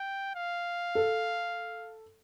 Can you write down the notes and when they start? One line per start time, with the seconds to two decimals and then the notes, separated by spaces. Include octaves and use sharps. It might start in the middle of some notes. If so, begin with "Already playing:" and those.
Already playing: G5
0.36 F5
0.95 A4